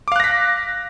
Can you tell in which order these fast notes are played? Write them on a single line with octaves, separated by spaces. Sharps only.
D6 F5 F#6 A#6 B6